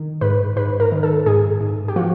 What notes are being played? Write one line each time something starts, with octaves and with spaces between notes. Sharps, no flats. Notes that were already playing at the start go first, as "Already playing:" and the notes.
Already playing: D#3
G#2 B4
G#2 B4
A#4
D#3
A4
G#2 G#4
G#2
G4
F3 F#4